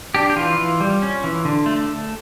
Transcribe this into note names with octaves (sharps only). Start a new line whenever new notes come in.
D4 G4
G4
E3 F4
E3
G3
C#4
E3
D3
A3